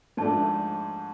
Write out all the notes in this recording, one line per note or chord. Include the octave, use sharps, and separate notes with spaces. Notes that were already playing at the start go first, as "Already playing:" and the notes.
G#2 F3 A3 D4 A5